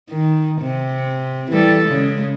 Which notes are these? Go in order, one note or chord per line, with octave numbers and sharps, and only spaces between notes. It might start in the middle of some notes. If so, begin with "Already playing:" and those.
D#3
C3
E3 G3 A4
C#3 G#3